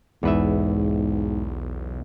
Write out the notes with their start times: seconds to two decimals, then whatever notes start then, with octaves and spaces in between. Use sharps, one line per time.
0.23 B1 E2 G#2 B4 E5